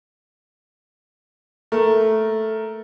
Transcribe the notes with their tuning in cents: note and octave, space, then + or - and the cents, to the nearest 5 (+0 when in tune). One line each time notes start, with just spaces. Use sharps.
A3 -5 A#4 +0